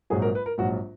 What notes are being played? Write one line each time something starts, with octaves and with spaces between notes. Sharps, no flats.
A#1 G#2 F#3 G#4
A#4
B4
A#4
A#1 G#2 F#3 F#4